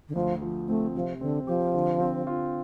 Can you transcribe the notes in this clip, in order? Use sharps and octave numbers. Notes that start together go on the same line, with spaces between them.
D3
D2 F3
F3
A3 C4
C3 F3
D3 C4
F3 G4
D3
C4
F4